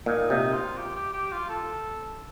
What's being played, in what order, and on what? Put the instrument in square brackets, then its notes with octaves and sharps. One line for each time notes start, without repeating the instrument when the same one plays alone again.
[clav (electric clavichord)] A#2 [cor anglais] D#4
[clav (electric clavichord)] C3 [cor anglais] D#4
[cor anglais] F4
G4
G4
G4
F4
A4